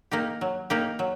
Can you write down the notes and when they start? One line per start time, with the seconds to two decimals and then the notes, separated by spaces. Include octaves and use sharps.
0.11 A#3 D#4 G4
0.41 F#3
0.70 A#3 D#4 G4
0.99 F#3